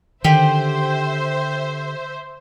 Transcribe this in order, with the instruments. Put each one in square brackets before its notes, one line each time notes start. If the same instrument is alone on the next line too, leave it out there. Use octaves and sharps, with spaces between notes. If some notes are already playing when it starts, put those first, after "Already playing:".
[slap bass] D3 [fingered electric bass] D#3 [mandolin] G4 [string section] C5 E5